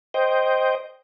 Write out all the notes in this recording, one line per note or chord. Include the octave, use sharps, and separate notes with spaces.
C5 D#5 G5